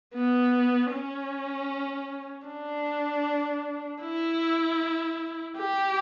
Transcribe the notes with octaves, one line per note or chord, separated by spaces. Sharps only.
B3
C#4
D4
E4
G4